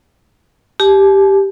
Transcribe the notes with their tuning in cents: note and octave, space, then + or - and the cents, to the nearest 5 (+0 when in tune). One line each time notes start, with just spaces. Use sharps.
G4 +0 A5 -45